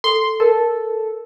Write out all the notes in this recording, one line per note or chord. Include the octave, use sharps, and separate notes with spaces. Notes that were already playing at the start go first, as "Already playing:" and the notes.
A4 C6
A4 A#4